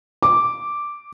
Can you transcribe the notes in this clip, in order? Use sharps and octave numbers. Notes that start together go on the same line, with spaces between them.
D6